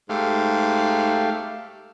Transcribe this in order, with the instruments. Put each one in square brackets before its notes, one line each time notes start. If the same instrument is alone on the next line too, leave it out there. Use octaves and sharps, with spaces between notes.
[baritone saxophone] G#2 [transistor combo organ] A3 G4 F5